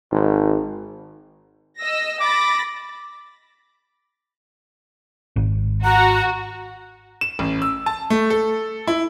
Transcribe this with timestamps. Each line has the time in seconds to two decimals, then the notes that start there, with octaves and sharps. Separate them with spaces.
0.12 G#1
1.78 D#5 E6 A#6
2.20 B5 D6 A6 A#6
5.36 G#1
5.84 F#4 A#5
7.21 E7
7.39 A1
7.62 E6
7.86 A5
8.10 A3
8.30 A4
8.87 E4